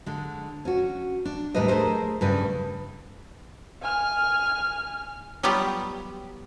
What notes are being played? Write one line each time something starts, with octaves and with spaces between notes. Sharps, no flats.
D3 G#3
C#4 F#4
D4
D#2 A2 G3 D4 B4 D#5
A3 G#4 A#4 C5
G2 C#3 B4
G#5 F6
F#3 G3 B3 F4 G4